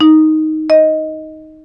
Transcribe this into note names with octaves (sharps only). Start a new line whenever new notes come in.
D#4
D#5